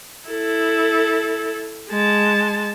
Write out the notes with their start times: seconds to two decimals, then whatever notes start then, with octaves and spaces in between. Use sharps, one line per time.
0.29 E4 A4
1.90 G#3 A5